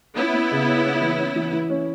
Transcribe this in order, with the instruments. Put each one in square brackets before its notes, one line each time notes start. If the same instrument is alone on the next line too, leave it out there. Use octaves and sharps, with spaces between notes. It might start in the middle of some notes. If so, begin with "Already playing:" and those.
[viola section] B3 E4 [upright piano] C#4
[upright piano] C#4
C#3
C#4
C#4
E3
C#4
E3
E3
C#4